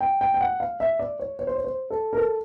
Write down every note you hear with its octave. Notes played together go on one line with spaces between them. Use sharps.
G5
G5
G5
F#5
F5
E5
D5
C#5
C#5
C5
C#5
C5
A4
A#4
A4